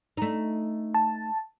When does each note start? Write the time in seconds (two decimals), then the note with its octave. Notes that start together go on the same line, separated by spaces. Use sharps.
0.17 A3 D#4
0.94 A5